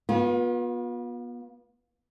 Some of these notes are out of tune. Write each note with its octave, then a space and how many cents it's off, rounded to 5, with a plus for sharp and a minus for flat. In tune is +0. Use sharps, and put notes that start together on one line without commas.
B3 -30 F4 +40